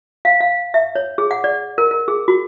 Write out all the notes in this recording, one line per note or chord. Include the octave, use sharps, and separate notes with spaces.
F5
F5
E5
C#5
G#4
F#5
D5
A#4
A#4
G#4
F#4